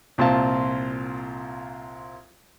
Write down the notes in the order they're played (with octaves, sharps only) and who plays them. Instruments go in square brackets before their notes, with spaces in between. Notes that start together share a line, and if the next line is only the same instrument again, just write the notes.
[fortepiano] C2 A#2 C4 F4 F5 A5